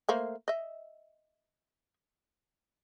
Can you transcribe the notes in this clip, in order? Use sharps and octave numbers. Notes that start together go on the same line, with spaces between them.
A3 A#3 C5
D#5 E5